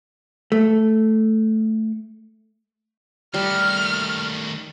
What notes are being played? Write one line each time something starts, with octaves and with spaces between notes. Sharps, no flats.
A3
D#3 G3 A3 F6